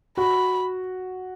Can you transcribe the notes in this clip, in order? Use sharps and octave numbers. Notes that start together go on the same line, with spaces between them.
F#4 B5